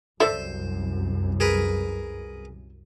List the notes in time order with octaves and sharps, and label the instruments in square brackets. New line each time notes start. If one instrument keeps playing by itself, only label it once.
[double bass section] C2 F#2 [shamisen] A4 D5 E5 [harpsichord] C5
[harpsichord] G#4 A#4 B4